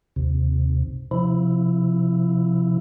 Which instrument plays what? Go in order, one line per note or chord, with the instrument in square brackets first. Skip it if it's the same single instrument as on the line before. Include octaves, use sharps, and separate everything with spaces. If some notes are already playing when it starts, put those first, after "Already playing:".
[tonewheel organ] D#2 C3
C3 F3 E4